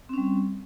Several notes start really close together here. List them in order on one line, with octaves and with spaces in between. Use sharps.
C4 C#4 G3